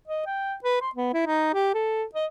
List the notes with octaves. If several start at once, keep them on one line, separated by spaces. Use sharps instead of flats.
D#5
G5
B4
C6
B3
E4
D#4
G4
A4
D#5